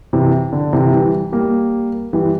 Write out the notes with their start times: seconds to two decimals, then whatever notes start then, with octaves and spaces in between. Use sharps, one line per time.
0.13 C3 E3
0.53 D3
0.73 C3 E3
0.93 E3 G3
1.32 G3 A#3
2.13 E3 G3